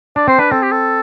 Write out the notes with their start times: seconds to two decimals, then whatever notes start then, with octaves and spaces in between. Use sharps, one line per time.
0.16 D4 D5
0.28 C4 C5
0.38 D4 B4
0.51 C4 A4
0.62 G4
0.72 A4